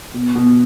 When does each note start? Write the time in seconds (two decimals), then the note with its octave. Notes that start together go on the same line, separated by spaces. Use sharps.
0.14 B2
0.35 B2